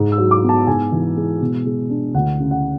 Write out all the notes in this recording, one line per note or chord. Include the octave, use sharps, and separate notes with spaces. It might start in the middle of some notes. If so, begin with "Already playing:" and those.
Already playing: G#2
E6
F#3
D6
B3
A5
G#2 G#5
E3
G#3
B2
G#3
D4
D2 F#5
C#3
F#5